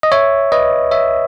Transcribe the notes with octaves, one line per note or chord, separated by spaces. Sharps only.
D#5
C#5 E5
B4 D#5
C#5 E5